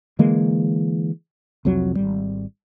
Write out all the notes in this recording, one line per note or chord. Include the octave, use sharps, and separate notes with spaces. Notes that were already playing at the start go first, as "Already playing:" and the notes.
D3 E3 G#3 A#3
C2 F2 F#3
G#1 G3